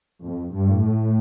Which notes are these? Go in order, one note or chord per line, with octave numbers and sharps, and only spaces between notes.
F2
G2
A2